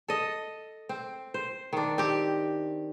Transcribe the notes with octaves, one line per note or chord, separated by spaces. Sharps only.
A4 D#5
C4
C5
D#3 D4
C4 G4